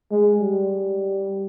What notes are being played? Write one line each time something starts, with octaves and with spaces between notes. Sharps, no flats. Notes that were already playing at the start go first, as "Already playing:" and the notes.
G#3
G3